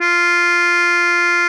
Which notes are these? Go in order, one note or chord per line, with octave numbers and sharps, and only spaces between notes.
F4